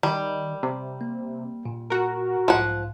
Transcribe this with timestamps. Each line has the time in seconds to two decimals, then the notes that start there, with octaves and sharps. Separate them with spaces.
0.03 D#3 G3
0.63 C3
1.01 A#3
1.65 A#2
1.90 F#4 A#4
2.48 B1 G#2 F3 F#5